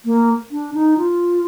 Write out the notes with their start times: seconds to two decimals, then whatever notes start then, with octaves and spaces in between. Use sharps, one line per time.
0.05 A#3
0.51 D4
0.74 D#4
0.98 F4